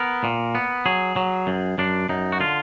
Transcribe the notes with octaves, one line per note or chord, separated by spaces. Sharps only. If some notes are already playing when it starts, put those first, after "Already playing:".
Already playing: B3 A#4
A#2
B3
F#3 G#4
F#3
F#2
F#2 D4
F#2 D#4
F#4
D3 F4